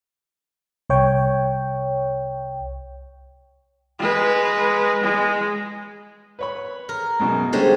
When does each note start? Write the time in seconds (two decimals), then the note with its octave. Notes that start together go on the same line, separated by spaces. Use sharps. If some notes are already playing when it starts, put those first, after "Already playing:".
0.90 C2 C#5 G5
3.99 G#3 B4
5.03 G#3
6.39 B4 C#5 B5
6.89 A#4
7.20 F#2 B2 G#3
7.53 D3 G3 G#3 C#4 C5